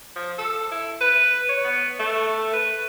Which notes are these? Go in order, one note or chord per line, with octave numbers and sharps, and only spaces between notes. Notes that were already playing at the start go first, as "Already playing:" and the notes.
F3
A4
E4
B4
C#5
B3
A3
B4